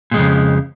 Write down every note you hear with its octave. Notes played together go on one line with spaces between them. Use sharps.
F2 A#2 C#3 G#3